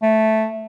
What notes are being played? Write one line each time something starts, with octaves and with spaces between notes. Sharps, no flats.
A3